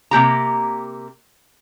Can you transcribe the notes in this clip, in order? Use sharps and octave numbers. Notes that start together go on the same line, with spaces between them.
C3 A#3 G4 A#5